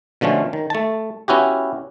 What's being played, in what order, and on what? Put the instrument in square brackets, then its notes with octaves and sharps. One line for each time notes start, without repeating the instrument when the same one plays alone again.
[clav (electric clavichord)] B2 D3 F3 A3 C#4
D#3
A3 A5
B3 C#4 E4 F#4 G4